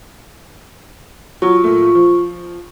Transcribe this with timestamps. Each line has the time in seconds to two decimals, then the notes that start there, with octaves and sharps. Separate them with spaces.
1.42 F#3 F4 C#6
1.64 A#2 A3
1.95 F3